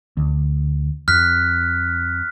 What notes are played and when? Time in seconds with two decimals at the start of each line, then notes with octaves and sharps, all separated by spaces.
0.17 D2
1.08 F2 F6 F#6 B6